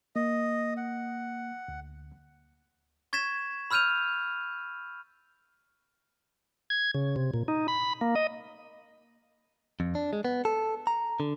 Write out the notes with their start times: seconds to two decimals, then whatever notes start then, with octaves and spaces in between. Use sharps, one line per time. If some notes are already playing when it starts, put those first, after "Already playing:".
0.16 A#3 D#5
0.77 F#5
1.68 D2
3.13 C#6 G#6 A6 B6 E7
3.71 B5 E6 F6 G6 D#7 F7
6.70 G#6
6.94 C#3
7.16 C3
7.34 A#2
7.48 D#4
7.68 B5
8.01 A#3
8.15 D#5
9.80 F2
9.95 D4
10.13 G#3
10.25 B3
10.45 A4
10.87 A#5
11.20 D3